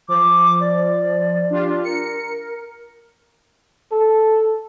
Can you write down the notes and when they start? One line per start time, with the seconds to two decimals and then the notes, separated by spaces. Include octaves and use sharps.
0.08 F3 D6
0.60 D5
1.50 D4 F4 G4
1.84 A#4 C#7
3.92 A4